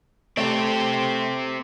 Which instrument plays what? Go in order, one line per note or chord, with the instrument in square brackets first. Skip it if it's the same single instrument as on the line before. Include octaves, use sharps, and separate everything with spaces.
[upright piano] A3 [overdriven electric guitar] C4 G4